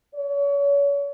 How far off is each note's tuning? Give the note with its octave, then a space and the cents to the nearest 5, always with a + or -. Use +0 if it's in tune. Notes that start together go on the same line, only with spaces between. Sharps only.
C#5 +35